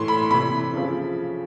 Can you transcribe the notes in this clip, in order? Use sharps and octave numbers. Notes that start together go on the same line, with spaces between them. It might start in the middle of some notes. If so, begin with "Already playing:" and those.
Already playing: A2 E3 C6
B5
C3 E3 B5
C#3 F3